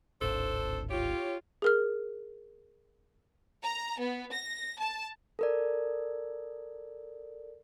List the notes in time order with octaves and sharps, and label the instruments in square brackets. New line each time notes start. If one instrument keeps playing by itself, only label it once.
[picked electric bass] D1 G#1 [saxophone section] D4 A4 C5
[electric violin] F4 [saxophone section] G4 C#5
[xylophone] G#4 A#4 F6
[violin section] A#5
B3
A#6
A5
[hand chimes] A4 A#4 D5